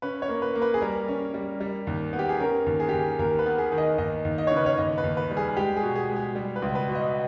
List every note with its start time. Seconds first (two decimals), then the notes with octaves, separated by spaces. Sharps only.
0.02 C#4 B4
0.22 C#5
0.28 A#3
0.42 B4
0.55 A#3
0.62 B4
0.74 G#4
0.81 G3 A#4
1.08 C#4
1.34 G3
1.60 G3
1.87 D#2
2.13 B3
2.19 G4
2.29 G#4
2.40 C#4 A#4
2.66 D#2
2.80 G#4
2.89 D#2 G4
2.99 G#4
3.19 D#2 A#4
3.39 B4
3.46 B3
3.58 G#4
3.72 D#3
3.78 D#5
3.98 D#2 D#5
4.25 D#2
4.38 D#5
4.47 C#3 C#5
4.57 B4
4.66 C#5
4.78 D#2 D#5
4.98 B4
5.04 D#2
5.17 B4
5.31 G3
5.37 G#4
5.57 G#3 G4
5.77 G#4
5.83 B2
5.96 G#4
6.09 G#3
6.16 G#4
6.35 G3
6.56 B4
6.62 C#2
6.75 B4
6.88 B2
6.95 D#5